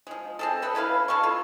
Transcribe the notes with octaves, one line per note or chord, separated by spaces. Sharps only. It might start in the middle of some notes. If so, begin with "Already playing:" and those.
F3 G#3
C4 G#4 A4
A4 B4 E5
C#3 E4 B4 F5
C#3 A4 F5 C#6
F4